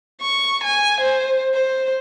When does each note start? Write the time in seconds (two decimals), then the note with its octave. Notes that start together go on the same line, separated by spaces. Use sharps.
0.21 C#6
0.64 G#5
1.01 C5
1.54 C5